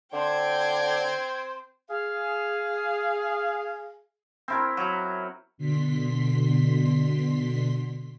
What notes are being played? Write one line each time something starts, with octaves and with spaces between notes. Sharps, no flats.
D3 C4 C5 G5 G#6
G#4 F5
C4 E4 A#4
F#3
B2 D3 C6 B6